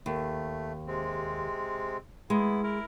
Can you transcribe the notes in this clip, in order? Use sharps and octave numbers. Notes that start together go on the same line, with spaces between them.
D#2 A3
C3 G#3 C4
G#3 B3 E4
E4 A#4